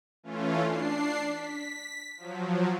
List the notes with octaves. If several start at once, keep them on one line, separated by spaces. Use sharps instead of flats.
E3 A3 C#4 F4
D4 C7
B6
F3 F#3